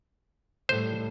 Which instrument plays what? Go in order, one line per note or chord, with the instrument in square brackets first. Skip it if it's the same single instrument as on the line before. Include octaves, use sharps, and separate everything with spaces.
[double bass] A2 G3 [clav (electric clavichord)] C5